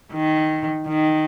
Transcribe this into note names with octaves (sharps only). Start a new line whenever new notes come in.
D#3
D#3